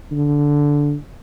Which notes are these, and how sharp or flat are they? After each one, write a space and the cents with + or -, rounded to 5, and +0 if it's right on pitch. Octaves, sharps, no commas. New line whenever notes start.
D3 -10